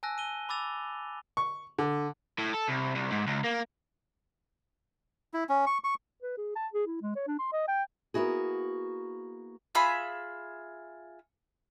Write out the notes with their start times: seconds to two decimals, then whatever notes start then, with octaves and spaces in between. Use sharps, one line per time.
0.03 G#5 A5 E6 F#6 A#6
0.18 D#7 G7
0.49 B5 D6 E6 A6 F7
1.37 C#6
1.78 D3
2.39 A2
2.55 A4
2.69 C2
2.96 C2
3.12 G#2
3.27 C#2
3.44 A#3
5.33 E4
5.49 C#4
5.66 C#6
5.84 C#6
6.22 B4
6.38 G#4
6.56 A5
6.73 G#4
6.87 E4
7.02 G#3
7.16 C#5
7.27 D4
7.39 C6
7.53 D#5
7.68 G5
8.14 A#3 B3 E4 F#4 G#4
9.75 F4 G#4 E5 B5